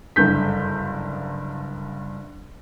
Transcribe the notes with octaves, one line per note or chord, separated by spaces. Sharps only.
F#1 G2 D3 G6 B6